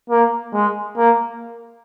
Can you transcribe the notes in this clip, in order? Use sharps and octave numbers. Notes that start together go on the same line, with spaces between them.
A#3
G#3
A#3